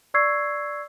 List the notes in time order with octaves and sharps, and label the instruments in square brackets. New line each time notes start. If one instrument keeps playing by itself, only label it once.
[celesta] D5 C#6 E6 G#6 C7